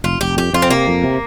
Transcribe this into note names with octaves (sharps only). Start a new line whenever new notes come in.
F1 F4
F1 G4
F2 G4
F2 F4
C4
C3 A#3
F2
C3